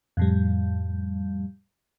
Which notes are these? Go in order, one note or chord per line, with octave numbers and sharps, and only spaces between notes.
F2 A2 G3